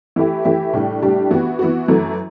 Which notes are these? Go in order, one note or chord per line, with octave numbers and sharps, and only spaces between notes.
E3 A3 E4 G4
E3 A3 E4 G4
A2 G3 D4 G4
A2 G3 D4 G4
E3 B3 F#4
E3 B3 F#4
F#2 E3 A3